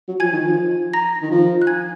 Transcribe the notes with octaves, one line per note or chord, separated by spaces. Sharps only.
F#3
F3 G#5 G#6
D#3
F3
A#5 A#6
D#3
F3
F#6
G#5 G#6